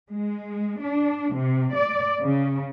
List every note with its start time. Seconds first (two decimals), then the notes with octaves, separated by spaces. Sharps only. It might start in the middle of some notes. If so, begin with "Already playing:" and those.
0.11 G#3
0.81 D4
1.35 C3
1.76 D5
2.21 C#3